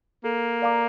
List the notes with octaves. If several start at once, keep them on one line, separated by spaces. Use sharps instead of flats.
A#3 A4
D5 F5 A#5 D6